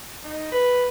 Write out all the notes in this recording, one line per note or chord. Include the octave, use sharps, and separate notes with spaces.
D#4
B4